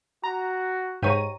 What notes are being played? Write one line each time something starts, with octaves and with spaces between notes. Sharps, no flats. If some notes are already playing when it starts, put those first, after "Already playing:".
F#4 A#5
G#2 G4 C#5 A#5 D#7